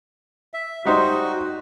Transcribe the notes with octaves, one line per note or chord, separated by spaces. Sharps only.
E5
G3 D#4 F#4 C5